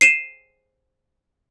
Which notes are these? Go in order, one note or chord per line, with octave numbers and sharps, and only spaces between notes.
C7 D#7 E7